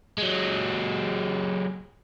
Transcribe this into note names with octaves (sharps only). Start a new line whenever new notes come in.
F#3 G#3